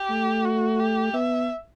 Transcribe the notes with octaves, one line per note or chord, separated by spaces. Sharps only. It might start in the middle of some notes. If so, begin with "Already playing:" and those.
Already playing: G4
A3
F#4
G4
B3 E5